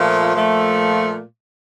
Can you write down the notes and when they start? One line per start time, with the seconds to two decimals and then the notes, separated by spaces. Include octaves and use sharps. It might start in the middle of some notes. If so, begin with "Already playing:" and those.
Already playing: A#2 F3 A3
0.34 A#2 F3 A3